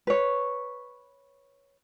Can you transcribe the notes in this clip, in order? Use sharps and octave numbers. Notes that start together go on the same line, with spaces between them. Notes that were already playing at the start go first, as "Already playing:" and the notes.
B4 C#5